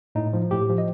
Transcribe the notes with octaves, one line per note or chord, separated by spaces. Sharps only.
A2 D#4
F3
A2 G4
F3
D#5